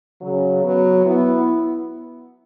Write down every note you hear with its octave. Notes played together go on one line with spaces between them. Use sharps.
C#3 F#3
F#3 B3
B3 E4